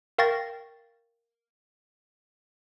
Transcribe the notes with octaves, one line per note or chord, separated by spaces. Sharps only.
A#4 F5 G5 C#6 A6 A#6